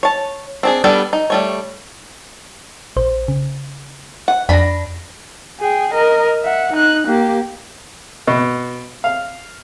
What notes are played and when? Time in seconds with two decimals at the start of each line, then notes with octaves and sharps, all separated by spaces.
0.03 C#5 A5
0.63 C4 D4 G#4
0.84 G3 B3 D4 A4 B4
1.13 D#4
1.30 G3 A3 C#5
2.96 A#1 C5
3.28 C#3
4.28 F#5
4.49 F2 D4 B5 A#6
5.61 G#4 G5
5.94 A#4 D#5
6.42 E5 F#5
6.73 D#4 F#6
7.08 A#3 G4
8.27 B2
9.04 F5